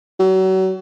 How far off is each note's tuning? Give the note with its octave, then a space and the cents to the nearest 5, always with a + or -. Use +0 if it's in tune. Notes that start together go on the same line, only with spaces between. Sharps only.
F#3 +35